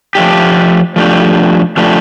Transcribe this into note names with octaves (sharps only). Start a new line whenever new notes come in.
F3 A3 D4 G4
F3 A3 D4 G4
F3 A3 D4 G4